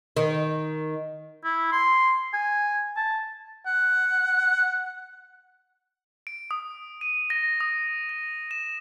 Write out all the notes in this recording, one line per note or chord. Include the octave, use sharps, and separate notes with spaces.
D#3
E4
C6
G#5
A5
F#5
D7
D#6
D#7
A#6
D#6
A#6
E7